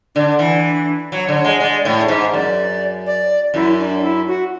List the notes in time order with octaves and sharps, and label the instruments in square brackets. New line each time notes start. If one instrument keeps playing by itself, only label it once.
[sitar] D3 [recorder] D4
[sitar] E3
[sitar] F#3 [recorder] C#5
[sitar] D3
[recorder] C#5
[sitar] G#3
[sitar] G#3 [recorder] D5
[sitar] A2 [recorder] D5
[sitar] G#2 [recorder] E5
[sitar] F#2 [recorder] D5
[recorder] D5
[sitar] F#2 [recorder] E4
[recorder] D4
E4
F#4